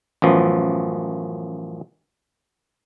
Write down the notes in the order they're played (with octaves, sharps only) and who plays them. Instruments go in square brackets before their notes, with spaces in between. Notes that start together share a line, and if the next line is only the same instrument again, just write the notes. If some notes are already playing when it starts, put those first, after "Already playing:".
[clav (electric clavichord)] A1 F#2 F3 B3